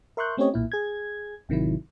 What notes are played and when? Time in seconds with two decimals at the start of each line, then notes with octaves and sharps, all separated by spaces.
0.17 A#4 E5 C6 C#6 F#6 G6
0.37 A3 C4 C#4 G4 C#5 D#5
0.54 B1 A#2 E4
0.72 G#4 G#6
1.49 A1 C3 D#3 F#3 E4